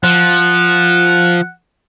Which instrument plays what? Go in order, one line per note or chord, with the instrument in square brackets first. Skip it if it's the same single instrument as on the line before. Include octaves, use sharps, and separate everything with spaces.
[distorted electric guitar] F3 [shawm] F#5